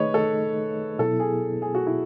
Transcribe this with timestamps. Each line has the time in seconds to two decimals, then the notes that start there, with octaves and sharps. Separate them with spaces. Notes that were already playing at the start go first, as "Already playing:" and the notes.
Already playing: D#3 A3 D#4 G#4 B4 C#5 D#5
0.14 A4
0.99 B2 F#3 B3 E4 A4
1.20 G#4
1.62 G#4
1.75 F#4
1.87 E4